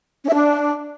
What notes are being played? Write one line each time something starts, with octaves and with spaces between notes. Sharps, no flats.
C#4
E5
D4